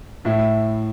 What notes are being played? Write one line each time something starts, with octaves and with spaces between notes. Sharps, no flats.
A2 E4